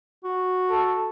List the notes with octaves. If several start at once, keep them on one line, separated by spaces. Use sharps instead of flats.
F#4
A4